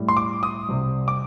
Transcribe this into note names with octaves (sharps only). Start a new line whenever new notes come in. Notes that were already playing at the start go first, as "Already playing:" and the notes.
Already playing: A2 G3
C6
D6
D#6
C2 C3 G3
D6